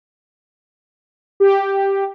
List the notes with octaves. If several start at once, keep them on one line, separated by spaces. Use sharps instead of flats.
G4